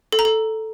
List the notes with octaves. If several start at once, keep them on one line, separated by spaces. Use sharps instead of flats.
A4
A#5
A4